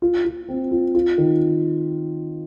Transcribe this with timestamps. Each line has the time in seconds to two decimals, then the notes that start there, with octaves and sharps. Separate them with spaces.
0.02 F4
0.25 F4
0.49 C4
0.71 F4
0.95 F4
1.18 D#3